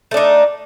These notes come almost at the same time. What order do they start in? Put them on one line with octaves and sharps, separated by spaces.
A3 D4 D#4